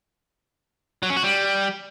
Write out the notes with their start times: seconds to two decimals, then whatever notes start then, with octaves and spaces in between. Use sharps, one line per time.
1.03 F#3
1.10 C#4
1.17 F#4
1.23 G3